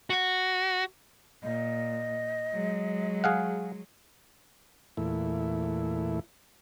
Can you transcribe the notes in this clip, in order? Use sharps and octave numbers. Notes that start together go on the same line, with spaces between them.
F#4
A#2 D#5
F#3 G#3
G#4 F5 F#5
E2 A#2 A3 E4